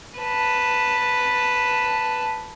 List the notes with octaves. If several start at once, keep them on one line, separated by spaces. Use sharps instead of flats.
B4 A5